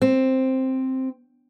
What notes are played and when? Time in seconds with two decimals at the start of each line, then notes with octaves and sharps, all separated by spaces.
0.02 C4